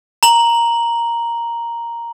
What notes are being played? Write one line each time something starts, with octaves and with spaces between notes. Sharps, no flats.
A#5 F#7